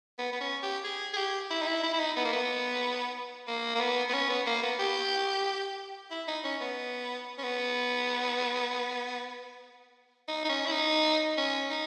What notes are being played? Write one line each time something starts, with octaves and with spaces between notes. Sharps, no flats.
B3
B3
C#4
G4
G#4
G#4
G4
E4
D#4
E4
E4
E4
D#4
B3
A#3
B3
A#3
A#3
B3
B3
C#4
B3
A#3
B3
G4
E4
D#4
C#4
B3
C#4
B3
D#4
D#4
C#4
E4
D#4
C#4
D#4